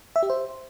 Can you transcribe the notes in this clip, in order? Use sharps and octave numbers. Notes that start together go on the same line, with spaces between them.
E5
G4
C5